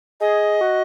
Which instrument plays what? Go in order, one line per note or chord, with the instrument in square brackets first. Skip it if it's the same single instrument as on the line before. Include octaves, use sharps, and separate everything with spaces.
[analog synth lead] G#4 [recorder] D#5
[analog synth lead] F#4